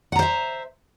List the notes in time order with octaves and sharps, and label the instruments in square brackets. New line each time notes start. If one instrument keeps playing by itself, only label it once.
[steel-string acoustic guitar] F#5
A#5
C5
E5